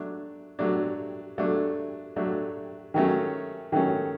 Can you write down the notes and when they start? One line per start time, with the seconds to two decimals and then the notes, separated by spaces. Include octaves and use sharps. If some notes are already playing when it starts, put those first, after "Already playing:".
Already playing: F#3 A3 D4
0.59 F#3 A3 D4
1.38 F#3 A3 D4
2.16 F#3 A3 D4
2.94 D#3 F#3 A3 C#4
3.72 D#3 F#3 A3 C#4